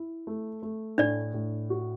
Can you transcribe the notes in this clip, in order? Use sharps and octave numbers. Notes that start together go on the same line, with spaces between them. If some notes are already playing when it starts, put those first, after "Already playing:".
Already playing: E4
A3
A3
A2 D4 D5
A2
F#4